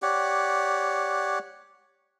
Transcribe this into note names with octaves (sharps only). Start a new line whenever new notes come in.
G4 C#5 D5 F#5